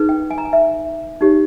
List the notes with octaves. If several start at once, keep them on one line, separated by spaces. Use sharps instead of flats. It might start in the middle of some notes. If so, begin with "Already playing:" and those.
Already playing: D#4 G#4 B4
G5
G#5
A#5
G#5
E5
D#4 G4 C#5